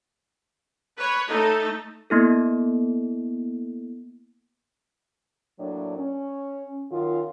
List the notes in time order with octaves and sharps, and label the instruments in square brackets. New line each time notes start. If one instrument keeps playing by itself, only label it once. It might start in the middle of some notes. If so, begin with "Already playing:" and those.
[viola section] B4 C#5
A3 D#4 A4
[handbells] A#3 B3 E4 A4
[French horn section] A2 F#3 A#3 D4
C#4
F#2 D#3 F4